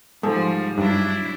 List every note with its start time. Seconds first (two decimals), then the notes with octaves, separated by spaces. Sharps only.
0.23 G#2 F3 G3 A4
0.78 G2 F#3 D4 E4